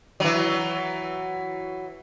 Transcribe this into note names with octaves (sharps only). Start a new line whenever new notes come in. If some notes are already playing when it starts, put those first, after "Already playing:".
E3 F#3